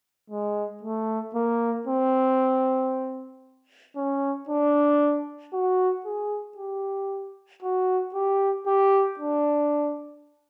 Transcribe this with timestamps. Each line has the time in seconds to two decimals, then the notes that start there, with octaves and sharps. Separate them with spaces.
0.30 G#3
0.83 A3
1.35 A#3
1.87 C4
3.96 C#4
4.49 D4
5.53 F#4
6.05 G#4
6.57 G4
7.62 F#4
8.14 G4
8.66 G4
9.19 D4